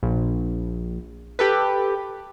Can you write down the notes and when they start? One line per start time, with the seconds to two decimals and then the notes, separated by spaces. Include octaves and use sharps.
0.03 A#1
1.39 G4 A4 B4